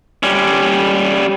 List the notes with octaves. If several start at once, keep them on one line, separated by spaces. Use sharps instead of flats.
G3 C#4